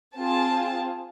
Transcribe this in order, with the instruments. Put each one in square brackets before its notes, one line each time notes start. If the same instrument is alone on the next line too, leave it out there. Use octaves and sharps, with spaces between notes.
[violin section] C4 F4 G#4 A5